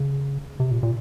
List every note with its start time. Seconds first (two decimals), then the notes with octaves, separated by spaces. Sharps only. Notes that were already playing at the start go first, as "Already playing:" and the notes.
Already playing: C#3
0.60 C3
0.71 A#2
0.83 A#2